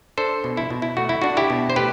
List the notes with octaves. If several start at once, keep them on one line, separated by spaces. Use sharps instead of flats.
D4 A4 C5
B2
E4
B2
E4
A3 F#4
E4
D4 F#4
E4 G4
B2
C5
A3 G4 B4